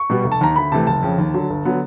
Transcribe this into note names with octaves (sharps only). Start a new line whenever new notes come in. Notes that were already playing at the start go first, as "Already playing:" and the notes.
Already playing: C#6
B2 G3 B3
F1
A5
D#2 D#3 A#5
D2 B5
C3 E3 A3 A5
F#1 A5
F2 C#3
D#2
D3 F#3
G1
D3 F#3 B3